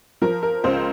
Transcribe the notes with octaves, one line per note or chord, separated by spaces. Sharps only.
F3 A#4
A#4
C#2 C5